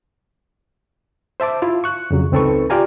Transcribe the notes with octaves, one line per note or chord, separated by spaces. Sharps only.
C5 E5 A5 D6
E4 F4 F5
C#6 F#6
F2 C#3 F#3
C#2 C4 D#4 A4 B4 C#6
F4 G4 D5 F5 G#5 A#5